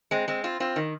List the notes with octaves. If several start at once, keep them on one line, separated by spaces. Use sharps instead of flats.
G#3 C4
G#3 C4
C4 F4
C4 F4
D#3